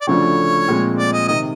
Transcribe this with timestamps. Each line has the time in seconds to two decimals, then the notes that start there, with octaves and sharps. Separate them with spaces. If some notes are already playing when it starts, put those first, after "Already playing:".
0.01 D5
0.07 D2 C#3 F3 A3 D4 C#5
0.68 A#2 F3 G#3 C4
0.98 D5
1.13 D#5
1.28 C3 D#3 D#5